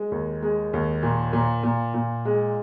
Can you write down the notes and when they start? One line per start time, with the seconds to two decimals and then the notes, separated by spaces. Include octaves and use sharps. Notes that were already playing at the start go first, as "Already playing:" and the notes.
Already playing: G#3
0.12 D#2
0.42 G#3
0.73 D#2
1.03 A#2
1.33 A#2
1.63 A#2
1.94 A#2
2.25 G#3